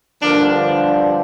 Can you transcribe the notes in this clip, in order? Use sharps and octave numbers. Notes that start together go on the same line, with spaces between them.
G2 D3 F3 A#3 D4